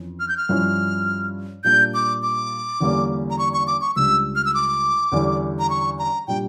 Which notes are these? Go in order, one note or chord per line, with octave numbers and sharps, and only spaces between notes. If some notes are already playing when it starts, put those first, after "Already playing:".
Already playing: F2 E3 C#4
F6
G6
F6
G2 F3 C#4 E4
A#2 G3 A#3 D4 G6
D6
D6
E2 D3 G3 A#3 C#4
A#5
C#6
C#6
D6
C#6
C#2 C#3 G3 D4 E6
F6
E6
D6
E2 D3 G3 C#4 E4
A#5
C#6
A#5
A#2 G3 D4 G5